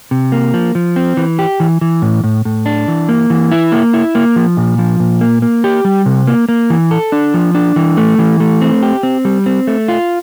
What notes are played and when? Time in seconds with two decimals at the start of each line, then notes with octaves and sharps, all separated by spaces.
0.11 C3
0.32 A#3
0.54 F3
0.75 F3
0.96 C4
1.17 E3
1.39 G4
1.60 E3
1.81 E3
2.02 A2
2.24 A2
2.45 A2
2.66 D4
2.88 E3
3.09 A#3
3.30 E3
3.51 E4
3.72 A#3
3.93 E4
4.15 A#3
4.36 F3
4.57 A#2
4.79 F3
5.00 A#2
5.21 A#3
5.42 A#3
5.64 G4
5.85 G3
6.06 C3
6.27 A#3
6.49 A#3
6.70 E3
6.91 A4
7.12 D4
7.34 F3
7.55 D4
7.76 E3
7.97 A3
8.19 E3
8.40 A3
8.61 C4
8.83 G4
9.03 C4
9.25 G3
9.46 C4
9.67 A3
9.88 F4